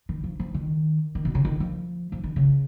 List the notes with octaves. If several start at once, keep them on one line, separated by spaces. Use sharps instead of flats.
D#3
F3
F3
D#3
D#3
B2
C#3
D#3
F3
F3
D#3
C#3